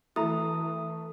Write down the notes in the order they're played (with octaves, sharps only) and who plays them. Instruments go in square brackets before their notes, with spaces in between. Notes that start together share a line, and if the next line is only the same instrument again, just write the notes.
[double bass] E3 [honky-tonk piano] A3 [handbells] E4 F#4 A#5 [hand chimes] D#6